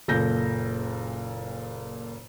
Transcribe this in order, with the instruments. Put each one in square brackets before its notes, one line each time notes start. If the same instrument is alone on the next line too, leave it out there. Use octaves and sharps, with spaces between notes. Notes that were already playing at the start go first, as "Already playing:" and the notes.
[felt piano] F#1 A#2 A4 G6 A#6